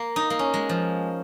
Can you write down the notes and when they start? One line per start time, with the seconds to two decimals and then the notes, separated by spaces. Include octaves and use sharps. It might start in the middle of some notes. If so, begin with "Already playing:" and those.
Already playing: A#3
0.16 D#4
0.30 A#3
0.39 C#4
0.54 G#3
0.69 F3